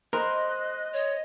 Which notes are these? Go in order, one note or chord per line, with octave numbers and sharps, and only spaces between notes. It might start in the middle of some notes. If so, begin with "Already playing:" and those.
A#4 C5 D#5 F#6
C#5